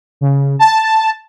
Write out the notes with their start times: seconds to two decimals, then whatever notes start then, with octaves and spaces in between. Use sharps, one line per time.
0.21 C#3
0.59 A5